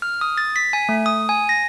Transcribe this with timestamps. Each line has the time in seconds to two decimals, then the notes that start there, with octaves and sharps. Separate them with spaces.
0.02 F6
0.21 D#6
0.38 A6
0.56 B6
0.73 G#5
0.89 A3
1.06 D#6
1.29 G#5
1.49 A#6